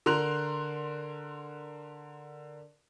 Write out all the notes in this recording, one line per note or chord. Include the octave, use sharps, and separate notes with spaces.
D3 A#4 C6 F#6 F7